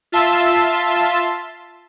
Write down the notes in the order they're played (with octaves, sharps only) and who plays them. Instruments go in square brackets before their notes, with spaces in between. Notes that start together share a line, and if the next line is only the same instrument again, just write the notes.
[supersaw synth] F4 E5 A5 C6 E6